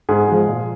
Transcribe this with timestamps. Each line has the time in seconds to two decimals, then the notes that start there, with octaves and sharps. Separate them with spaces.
0.09 G#2 G#4
0.28 F3 G#3
0.48 A#2